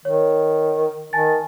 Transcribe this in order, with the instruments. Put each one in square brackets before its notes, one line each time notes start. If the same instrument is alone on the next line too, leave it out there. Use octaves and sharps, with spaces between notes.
[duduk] D#3 [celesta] C#5
[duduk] D#3 [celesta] G#5 A5 A6